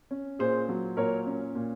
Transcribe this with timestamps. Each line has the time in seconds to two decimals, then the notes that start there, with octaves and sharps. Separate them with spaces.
0.11 C#4
0.39 A#2 G#4 C5
0.69 F#3
0.97 A#2 A#4 C#5
1.26 C#4
1.55 A#2